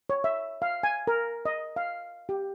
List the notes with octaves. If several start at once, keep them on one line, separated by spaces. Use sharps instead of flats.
C#5
E5
F5
G#5
A#4
D#5
F5
G4